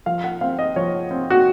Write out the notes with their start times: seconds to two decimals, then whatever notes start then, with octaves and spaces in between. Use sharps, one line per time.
0.06 F3 F5
0.24 F#5
0.41 C4 F5
0.59 D#5
0.76 F3 C#5
1.11 C4
1.30 F#4